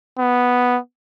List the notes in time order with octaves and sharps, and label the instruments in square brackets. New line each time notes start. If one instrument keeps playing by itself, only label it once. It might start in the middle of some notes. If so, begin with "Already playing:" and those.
[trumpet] B3